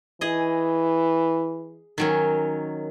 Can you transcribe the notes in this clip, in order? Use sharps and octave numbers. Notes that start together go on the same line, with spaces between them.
E3 G#4 D#5
D#3 F#3 C#4